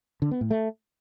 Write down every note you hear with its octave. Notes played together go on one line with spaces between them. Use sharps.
D3
B3
A2
A3